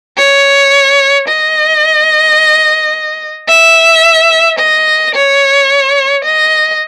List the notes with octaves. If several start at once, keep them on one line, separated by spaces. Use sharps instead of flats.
C#5
D#5
E5
D#5
C#5
D#5